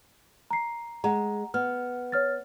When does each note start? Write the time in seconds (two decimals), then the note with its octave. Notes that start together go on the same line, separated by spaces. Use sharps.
0.51 A#5 C7
1.04 G#3 F#5 A#5
1.54 B3 F6
2.12 C#5 F6 A6